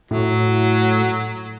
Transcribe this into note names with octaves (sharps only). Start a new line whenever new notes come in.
A2 F#3